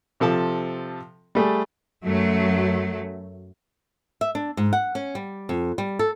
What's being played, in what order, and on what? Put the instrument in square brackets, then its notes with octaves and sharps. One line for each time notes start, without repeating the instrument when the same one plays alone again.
[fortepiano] C3 F3 A4 A5
G3 A3 G#4
[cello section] F#2 F#3 A3
[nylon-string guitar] E5
D4
G#2
F#5
C#4
G3
F2
G3
A4